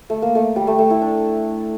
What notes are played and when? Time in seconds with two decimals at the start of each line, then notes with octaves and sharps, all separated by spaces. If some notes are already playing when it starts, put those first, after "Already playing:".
0.10 A3
0.22 A#3
0.35 A3
0.56 G3
0.67 A3
0.79 A3
0.90 E4
1.02 D4